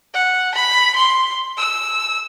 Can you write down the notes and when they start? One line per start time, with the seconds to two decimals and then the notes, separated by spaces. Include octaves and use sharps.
0.14 F#5
0.54 B5
0.95 C6
1.57 E6